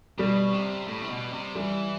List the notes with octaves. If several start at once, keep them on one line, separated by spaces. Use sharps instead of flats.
B2 G3
C3
A2
C3
B2
C3
E3 G3